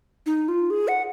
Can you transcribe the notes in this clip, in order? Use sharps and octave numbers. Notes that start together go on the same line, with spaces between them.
D#4
F4
G#4
F#5